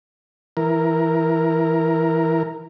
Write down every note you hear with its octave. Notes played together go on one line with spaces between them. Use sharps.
E3 A#4